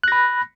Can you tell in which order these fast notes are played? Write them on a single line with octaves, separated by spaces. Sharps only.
F#6 A#6 B5